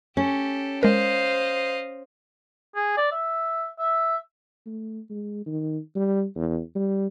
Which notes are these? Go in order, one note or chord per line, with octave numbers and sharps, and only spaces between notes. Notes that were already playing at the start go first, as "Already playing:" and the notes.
C#4 G4 A4
G#3 A#4 C5 D#5 F5
G#4
D5
E5
E5
A3
G#3
D#3
G3
E2
G3